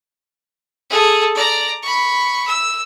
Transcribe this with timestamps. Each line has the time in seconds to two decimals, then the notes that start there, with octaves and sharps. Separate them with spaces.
0.90 G#4 A4
1.34 D5 A#5
1.83 B5 C#6
2.47 E6